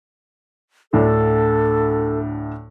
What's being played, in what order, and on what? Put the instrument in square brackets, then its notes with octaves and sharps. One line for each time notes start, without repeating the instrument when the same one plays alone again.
[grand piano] D2 A2 D4 [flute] A4